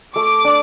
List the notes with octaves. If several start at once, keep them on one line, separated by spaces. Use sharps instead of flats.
A3 D6
D4